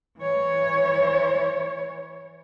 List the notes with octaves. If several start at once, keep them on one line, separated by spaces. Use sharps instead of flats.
E3 C#5